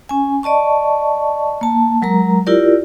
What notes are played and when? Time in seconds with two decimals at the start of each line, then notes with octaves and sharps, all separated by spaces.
0.09 C#4 G#5
0.43 D5 D#5 A5 C#6
1.61 A#3 A5
2.02 F#3 G#3 A#4 A#5
2.47 E4 F4 G4 A#4 D5